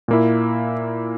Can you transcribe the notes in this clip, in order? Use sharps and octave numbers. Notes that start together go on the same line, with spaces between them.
A#2 A#3 E4